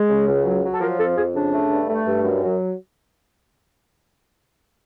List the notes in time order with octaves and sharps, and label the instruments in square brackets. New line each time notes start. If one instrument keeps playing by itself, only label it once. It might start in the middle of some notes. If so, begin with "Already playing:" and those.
Already playing: [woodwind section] G#3
C#3
C#2
F#3
F#3
A4
F3 A#4
F2 A4
F2 G#4
C#3 D4
A3
G2
A3
G2
F#2
F#3